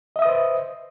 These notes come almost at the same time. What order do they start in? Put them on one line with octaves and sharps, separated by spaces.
D#5 E5 D#6 B4 C5